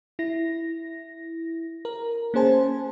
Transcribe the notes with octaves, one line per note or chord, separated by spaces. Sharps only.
E4 A#6
A#4
A#3 C#4 G#4 C5 G#5 A5